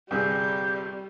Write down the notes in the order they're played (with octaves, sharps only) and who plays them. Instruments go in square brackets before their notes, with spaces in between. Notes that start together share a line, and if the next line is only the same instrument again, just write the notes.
[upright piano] G1 C3 G#4 [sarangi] G3 [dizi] G6